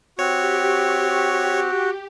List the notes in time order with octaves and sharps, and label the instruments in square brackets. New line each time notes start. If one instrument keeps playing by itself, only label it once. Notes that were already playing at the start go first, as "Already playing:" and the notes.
[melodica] C4 [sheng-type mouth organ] F#4 [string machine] G4 [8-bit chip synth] C#5